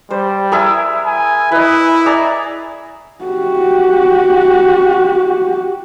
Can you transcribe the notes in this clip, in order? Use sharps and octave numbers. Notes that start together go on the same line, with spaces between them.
G3 C5
E4 G#4 A#4
G#5
E4 B4 D#5
G#4 D5 A#5
F#4 G4